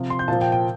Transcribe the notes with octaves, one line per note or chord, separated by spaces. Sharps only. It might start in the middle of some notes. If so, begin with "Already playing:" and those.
Already playing: C3 F3
C6
G6
A#2 F3 A5
G5
G5